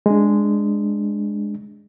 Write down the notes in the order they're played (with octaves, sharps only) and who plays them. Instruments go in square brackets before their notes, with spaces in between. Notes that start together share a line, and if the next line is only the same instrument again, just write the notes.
[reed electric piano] G#3 D4